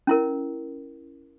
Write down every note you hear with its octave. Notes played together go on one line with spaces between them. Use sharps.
C#4 E4 A#4